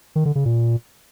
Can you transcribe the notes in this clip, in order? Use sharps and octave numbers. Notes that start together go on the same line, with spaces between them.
D#3
D3
C#3
A#2